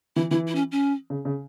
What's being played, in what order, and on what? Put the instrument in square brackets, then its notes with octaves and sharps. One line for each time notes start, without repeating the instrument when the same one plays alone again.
[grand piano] E3 [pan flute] E4
[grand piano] E3 [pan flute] E4
[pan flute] E4
C#4
C#4
[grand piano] C#3
C#3